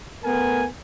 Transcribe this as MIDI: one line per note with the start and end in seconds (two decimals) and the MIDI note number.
0.24 0.65 57
0.24 0.65 59
0.24 0.65 70
0.24 0.65 80